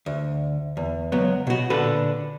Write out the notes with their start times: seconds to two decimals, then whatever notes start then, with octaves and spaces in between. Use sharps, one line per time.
0.06 D2
0.77 E2
1.12 C#2 F#3 B3
1.47 B2 F#4
1.70 A#2 D3 A4 B4